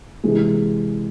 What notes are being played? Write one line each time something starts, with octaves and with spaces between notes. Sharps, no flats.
C3 E3 G#3